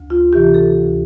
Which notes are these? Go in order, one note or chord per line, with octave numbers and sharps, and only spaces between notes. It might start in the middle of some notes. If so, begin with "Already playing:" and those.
Already playing: D2
F4
C3 E3 G4
A4
D2